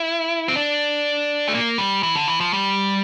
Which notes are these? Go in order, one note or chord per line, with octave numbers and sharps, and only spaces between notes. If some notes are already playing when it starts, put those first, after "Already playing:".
Already playing: E4
C4
D4
A3
A#3
G3
E3
D3
E3
F3
G3